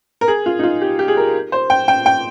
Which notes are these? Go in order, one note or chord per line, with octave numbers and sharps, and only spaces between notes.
A#4
G#4
F4
D#4
F4
G4
G4
G#4
A#4
C5
G5
G5
G5